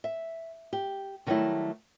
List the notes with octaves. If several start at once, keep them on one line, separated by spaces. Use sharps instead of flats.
E5
G4
D3 D#3 F#3 G3 A3 E4